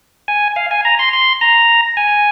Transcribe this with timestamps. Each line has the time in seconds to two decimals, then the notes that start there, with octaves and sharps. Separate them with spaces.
0.28 G#5
0.56 F5
0.71 G#5
0.85 A#5
0.99 C6
1.13 C6
1.41 A#5
1.97 G#5